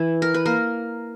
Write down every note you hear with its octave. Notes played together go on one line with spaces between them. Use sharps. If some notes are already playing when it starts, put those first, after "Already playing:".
Already playing: E3 E4
A#4
B4
A#3 A#4